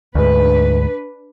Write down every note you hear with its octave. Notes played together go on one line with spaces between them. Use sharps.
D2 G#2 D4 B4